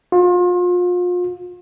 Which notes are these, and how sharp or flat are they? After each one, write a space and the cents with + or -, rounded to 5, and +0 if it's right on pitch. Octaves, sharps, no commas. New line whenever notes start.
F4 +35